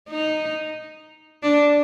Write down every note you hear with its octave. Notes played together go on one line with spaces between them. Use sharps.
D#4
D4